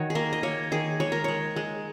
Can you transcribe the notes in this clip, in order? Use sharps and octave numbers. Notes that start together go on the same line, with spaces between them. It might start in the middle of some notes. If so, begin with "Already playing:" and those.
Already playing: D#3 D#4 F#4 C#5
G#4
A#3 A#4
D#5
A#3 C#5
D#3 G#4
G#3 C#5
A#4
G#3 C#5
G#3